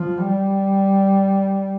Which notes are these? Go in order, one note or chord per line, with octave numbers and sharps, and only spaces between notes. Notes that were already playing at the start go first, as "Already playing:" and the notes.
Already playing: F3
G3